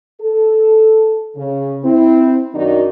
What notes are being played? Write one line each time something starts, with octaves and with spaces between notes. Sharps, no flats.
A4
C#3
C4 E4
F#2 D#3 D4 D#4 F#4 D5